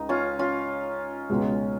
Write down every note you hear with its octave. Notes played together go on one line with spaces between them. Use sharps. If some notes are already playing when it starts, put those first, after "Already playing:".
Already playing: C#2 C#3 D#4
C#4 F4
C#4 F4
C#2 B2 G#3